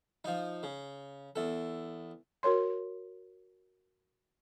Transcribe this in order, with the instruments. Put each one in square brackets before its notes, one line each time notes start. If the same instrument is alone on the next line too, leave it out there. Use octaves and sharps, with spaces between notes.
[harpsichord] F3 D#4
C#3
E2 A4
[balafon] F#4 A#4 C#5 C6